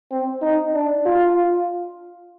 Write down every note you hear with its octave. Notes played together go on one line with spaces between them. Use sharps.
C4
D#4
D4
F4